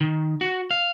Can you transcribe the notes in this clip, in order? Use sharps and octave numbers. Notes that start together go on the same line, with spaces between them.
D#3
F#4
F5